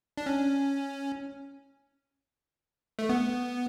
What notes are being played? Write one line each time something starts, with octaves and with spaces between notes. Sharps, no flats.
D4
C#4
A3
B3